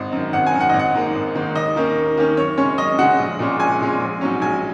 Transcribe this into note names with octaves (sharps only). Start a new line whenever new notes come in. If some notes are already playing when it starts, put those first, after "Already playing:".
Already playing: G#1 D#5
F#2 D#3
G#1 F#5
G#5
F#2 D#3
F#5
G#1 D#5
F#5
G#2 D#3 A#3
G#1
G#2 D#3 A#3
D#2 D#5
D#3 A#3 C#4
D#2
D#3 A#3 C#4
F#2 C#5
C#3 G#3 C#4 C#5
F#2 D#5
C#3 G#3 C#4 F#5
A#1
A#2 G#3 C#4
A#1 G#5
A#2 G#3 C#4
A#1
G#2 F#3 C#4
A#1 G#5